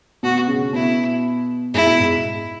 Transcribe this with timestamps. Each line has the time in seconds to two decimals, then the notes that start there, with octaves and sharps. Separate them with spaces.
0.23 B2 F#4
0.48 C#3
0.73 B2 E4
1.74 G#2 E4
1.86 B2
2.00 G#2